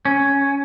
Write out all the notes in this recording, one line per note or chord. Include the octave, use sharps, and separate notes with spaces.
C#4